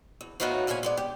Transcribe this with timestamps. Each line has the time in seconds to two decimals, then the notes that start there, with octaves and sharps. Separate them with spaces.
0.21 E2
0.40 A2 F#3 B3 D#4 F4 F#4
0.67 E2 A#2 F3 B3 C#4 G#5
0.83 G#3 B3 D5
0.97 G4